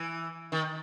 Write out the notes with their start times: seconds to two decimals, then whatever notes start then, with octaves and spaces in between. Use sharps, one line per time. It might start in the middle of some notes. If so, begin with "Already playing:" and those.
Already playing: E3
0.52 D#3